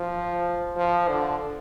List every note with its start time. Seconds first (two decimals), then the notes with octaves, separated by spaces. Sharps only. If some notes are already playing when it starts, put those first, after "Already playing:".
Already playing: F3
0.77 F3
1.08 D3